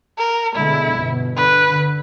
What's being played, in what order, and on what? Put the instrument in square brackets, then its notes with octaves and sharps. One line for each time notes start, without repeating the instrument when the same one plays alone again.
[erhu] A#4
[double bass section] B2 D3 G#3 [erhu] E4
[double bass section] G1 E2 B2
[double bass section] D3 [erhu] B4
[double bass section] D3